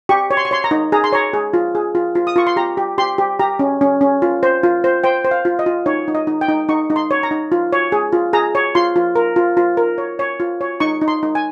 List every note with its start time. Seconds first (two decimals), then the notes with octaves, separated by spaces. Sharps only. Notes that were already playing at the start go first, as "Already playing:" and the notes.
0.09 G4 C#6
0.31 C#5
0.37 C6
0.45 C#6
0.51 C#5 C6
0.64 A#5
0.71 D#4
0.92 G#4 A#5
1.04 C6
1.12 C#5 A#5
1.34 G#4
1.54 F4
1.75 G#4
1.95 F4
2.15 F4
2.27 D#6
2.36 F4 C#6
2.47 C6
2.56 G4 A#5
2.77 G4
2.98 G4 C6
3.18 G4
3.39 G4 A#5
3.59 C#4
3.81 C#4
4.01 C#4
4.22 F4
4.43 C5
4.63 F4
4.84 C5
5.04 C5 G5
5.25 C5
5.31 F5
5.45 F4
5.59 D#5
5.66 F4
5.86 D#4 C#5
6.08 D#4
6.15 D#5
6.27 D#4
6.41 G5
6.49 D#4
6.69 D#4 C#6
6.90 D#4
6.96 C6
7.11 C#5
7.23 A#5
7.31 D#4
7.52 F4
7.73 C#5
7.92 G#4
8.13 F4
8.33 G#4 A#5
8.55 C#5
8.75 F4 C6
8.96 F4
9.16 A#4
9.36 F4
9.57 F4
9.77 A#4
9.98 C#5
10.19 C#5
10.40 F4
10.61 C#5
10.80 D#4 C#6
11.01 D#4
11.08 C6
11.23 D#4
11.35 G#5